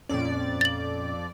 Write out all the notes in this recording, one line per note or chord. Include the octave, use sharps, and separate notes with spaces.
F2 A#2 C#4 D5
A6 F#7